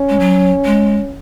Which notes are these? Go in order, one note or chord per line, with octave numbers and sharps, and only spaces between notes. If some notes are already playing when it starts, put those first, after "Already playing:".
Already playing: C#4
G#3
F#3
G#3